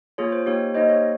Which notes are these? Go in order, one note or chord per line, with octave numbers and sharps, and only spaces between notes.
A#3 F4 G#4 C#5
C5
A#3 D#4 G4 C#5
A#3 D#4 G4 C5 D#5
C#5